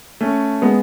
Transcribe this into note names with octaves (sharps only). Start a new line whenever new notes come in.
A3 C#4
G#3 B3